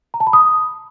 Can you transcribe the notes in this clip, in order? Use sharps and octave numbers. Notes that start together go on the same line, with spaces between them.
A#5
A5
B5
D#6